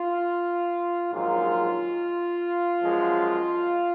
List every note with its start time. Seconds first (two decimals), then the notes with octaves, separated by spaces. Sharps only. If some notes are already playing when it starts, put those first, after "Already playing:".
Already playing: F4
1.12 A#1 G#2 D#3 F#3 F4
2.82 F#2 F3 G#3